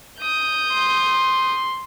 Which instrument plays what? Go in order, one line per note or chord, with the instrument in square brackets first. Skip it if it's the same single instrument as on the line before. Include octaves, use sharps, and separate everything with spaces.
[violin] D#6 G6
[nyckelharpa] C6